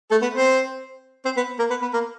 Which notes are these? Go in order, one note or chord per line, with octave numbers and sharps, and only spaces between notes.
A3 A4
B3 B4
C4 C5
C4 C5
B3 B4
A#3 A#4
B3 B4
B3 B4
A#3 A#4